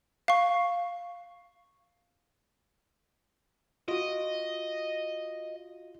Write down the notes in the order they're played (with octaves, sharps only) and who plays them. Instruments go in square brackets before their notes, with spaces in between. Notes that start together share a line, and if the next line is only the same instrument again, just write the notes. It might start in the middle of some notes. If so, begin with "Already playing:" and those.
[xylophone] F5 C#6
[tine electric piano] F4 F#4 [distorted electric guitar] D#5